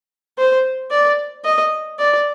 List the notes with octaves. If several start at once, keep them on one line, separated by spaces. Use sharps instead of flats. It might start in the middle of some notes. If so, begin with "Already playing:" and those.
C5
D5
D#5
D5